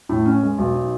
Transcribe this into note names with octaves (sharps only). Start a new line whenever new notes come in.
A2
C#4
G#3
B1
D#4